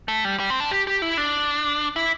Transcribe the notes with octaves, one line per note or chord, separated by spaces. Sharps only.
A3
G3
G3
C4
D4
G4
G4
E4
D4
E4